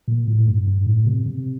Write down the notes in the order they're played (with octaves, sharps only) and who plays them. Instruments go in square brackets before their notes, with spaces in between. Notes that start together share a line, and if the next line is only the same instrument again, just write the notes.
[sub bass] A#2
A2
G2
G2
A2
C3
C3